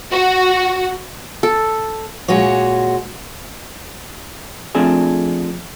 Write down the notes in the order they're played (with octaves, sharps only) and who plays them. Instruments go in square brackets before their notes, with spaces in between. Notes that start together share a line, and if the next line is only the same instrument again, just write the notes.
[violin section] F#4
[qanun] A4
[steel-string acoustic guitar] A#2 G#3 F#4 C#5
[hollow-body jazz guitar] F3 A3 C4 D4 G#4